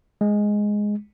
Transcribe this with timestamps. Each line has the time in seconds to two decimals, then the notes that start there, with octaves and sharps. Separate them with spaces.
0.21 G#3